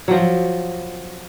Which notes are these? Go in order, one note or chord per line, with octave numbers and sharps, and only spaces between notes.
F3 F#3